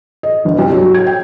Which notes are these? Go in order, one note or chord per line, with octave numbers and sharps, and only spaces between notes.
D#5
G1
C2
F#3
G#6
G5